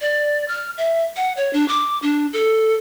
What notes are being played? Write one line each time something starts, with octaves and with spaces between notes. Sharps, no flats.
D5
F6
E5
F#5
C#5
D4
D6
D4
A4